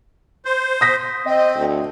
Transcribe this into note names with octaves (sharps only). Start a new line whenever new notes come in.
C5
D#6 A#6 B6
C4 D#5
D2